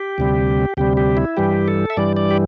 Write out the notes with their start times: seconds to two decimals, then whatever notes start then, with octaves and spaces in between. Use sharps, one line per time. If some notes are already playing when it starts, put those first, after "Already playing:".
Already playing: G4
0.18 D2 C3 G3
0.77 D2 C3 G3 G4
0.97 G4
1.17 E4
1.37 G2 E3 G3 G4
1.68 A4
1.90 E5
1.97 G2 E3 G3 D5
2.17 D5
2.31 G4